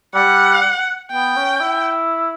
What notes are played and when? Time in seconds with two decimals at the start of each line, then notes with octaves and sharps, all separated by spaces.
0.14 G3 F#5
1.12 B3 G5
1.36 C#4
1.61 E4